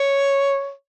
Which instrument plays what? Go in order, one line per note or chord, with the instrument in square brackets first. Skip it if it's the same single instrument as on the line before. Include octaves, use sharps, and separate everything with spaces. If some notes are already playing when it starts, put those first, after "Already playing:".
Already playing: [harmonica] C#5